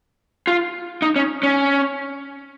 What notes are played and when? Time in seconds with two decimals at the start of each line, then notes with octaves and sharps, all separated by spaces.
0.47 F4
1.02 D#4
1.16 C#4
1.43 C#4